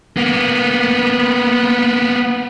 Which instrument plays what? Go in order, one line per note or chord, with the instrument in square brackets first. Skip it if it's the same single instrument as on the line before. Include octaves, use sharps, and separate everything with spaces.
[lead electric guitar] A#3 B3